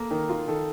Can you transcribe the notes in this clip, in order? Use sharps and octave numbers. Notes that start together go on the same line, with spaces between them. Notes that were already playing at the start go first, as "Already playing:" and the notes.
Already playing: A#3 A4
D#3 A#4
F4
D#3 A4